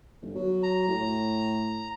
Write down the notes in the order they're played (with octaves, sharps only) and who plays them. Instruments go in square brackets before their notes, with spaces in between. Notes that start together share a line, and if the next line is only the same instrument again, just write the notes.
[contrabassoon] G1
F#3
[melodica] A#5
[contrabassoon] A2